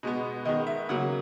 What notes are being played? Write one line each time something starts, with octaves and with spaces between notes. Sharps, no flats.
B2 G#3 B3
D#3 G#3 B3 D#5
E5
C#3 F#3 A#3 F#5